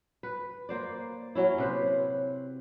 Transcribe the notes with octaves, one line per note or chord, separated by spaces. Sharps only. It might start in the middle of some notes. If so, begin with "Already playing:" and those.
B4
A#3 C5 D5
F#3 C#4 E4
C3 B4 C5